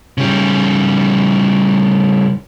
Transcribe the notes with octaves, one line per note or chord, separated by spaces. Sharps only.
C#3 G3